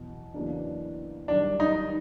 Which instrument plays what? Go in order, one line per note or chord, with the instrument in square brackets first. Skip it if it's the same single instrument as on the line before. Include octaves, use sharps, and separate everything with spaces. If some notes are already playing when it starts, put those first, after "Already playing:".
Already playing: [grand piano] E2 B2 F#3 B3
E2 C#3 F#3 A#3 D4
[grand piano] F#2 D#3 G3 [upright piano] D4
[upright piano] D#4